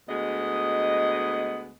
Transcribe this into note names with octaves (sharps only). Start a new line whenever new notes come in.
D2 G#3 B3 D#5